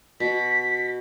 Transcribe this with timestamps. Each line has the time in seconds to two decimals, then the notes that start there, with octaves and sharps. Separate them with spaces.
0.20 B2 B6